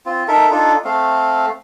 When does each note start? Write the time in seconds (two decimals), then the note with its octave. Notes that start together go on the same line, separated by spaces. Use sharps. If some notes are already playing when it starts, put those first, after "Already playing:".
0.06 C4 F4
0.28 D#4 A4 A#4 E5
0.51 D4 D#4 F4 A4
0.85 A3 C4 F5